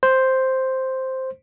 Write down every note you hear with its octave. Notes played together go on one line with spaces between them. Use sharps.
C5